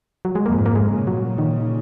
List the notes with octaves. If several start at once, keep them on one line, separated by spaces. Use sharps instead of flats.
F#3
G#3
F2 G#2 A#3
A#3
G#3
A#2 C#3
F#3
D#3